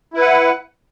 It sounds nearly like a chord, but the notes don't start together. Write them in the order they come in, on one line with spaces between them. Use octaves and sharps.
E4 B4 F#5